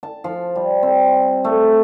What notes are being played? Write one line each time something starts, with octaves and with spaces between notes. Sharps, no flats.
A5
F3
G3
C4
A3